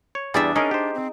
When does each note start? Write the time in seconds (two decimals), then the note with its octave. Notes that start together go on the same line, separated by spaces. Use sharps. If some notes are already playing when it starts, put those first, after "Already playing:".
0.15 C#5
0.34 E2 G3 D4 G#4 D5 E5
0.56 C#4 D#4 G#4 A#4
0.71 G4 C5
0.95 C4